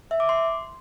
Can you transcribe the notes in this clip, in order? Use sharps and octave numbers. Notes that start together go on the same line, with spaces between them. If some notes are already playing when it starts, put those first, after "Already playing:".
E5
D6
C6